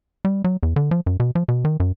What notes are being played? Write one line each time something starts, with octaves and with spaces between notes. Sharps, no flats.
G3
F#3
E2
D3
F3
F#2
B2
F3
B2
D#3
F#2